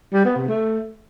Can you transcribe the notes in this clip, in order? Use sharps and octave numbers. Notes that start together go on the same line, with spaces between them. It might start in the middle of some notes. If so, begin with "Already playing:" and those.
G3
B3
C3
A3